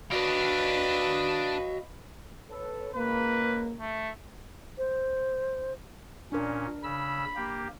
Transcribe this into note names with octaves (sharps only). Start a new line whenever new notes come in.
D4 F#4 B4 D5 D#5 F5
A4 B4 C#5
C#2 A#3 B4
A3
C5
A#2 C#4 D4 A#4
C#3 B5 E6
A#3 G4